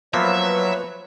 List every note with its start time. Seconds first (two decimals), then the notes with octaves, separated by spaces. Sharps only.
0.14 F3 F#3 A#3 B3 B4 C#5 E5